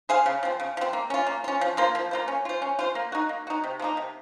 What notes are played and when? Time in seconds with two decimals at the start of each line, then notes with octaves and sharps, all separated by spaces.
0.09 G#4 C5 F5
0.26 C#3
0.43 F3 C4
0.60 C#3
0.77 F3 C4
0.93 A#3
1.10 C#4 F4
1.26 A#3
1.44 C#4 F4
1.61 F3
1.77 A#3 F4 C5
1.95 F3
2.11 A#3 F4 C5
2.28 C#4
2.45 F4 C5
2.62 C#4
2.79 F4 C5
2.95 A#3
3.12 D#4 F#4
3.29 A#3
3.47 D#4 F#4
3.64 C3
3.80 F3 A#3 D#4
3.97 C3